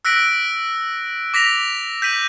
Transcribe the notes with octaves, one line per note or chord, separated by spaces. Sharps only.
E6 F#6 A#6 B6 D7
D6 A#6 B6 F7
G6 B6 D#7 F#7